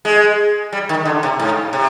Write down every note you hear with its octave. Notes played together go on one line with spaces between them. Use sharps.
G#3
G3
D#3
D3
C3
G#2
C3